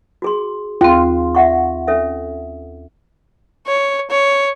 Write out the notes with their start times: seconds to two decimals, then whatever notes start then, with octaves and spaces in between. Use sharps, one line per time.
0.22 F#4 G#4 C6
0.81 D#2 C4 F4 G#4
1.35 E5 F#5 C#6
1.87 C#4 A4 E5
3.67 C#5
4.11 C#5